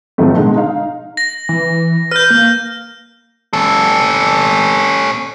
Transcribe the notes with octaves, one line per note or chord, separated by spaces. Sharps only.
G#2 D#3 F3 F#3 A3
B2 D3 G#3
D#4 F5
A#6
E3
B4 F6 G6
A#3
C#4 A4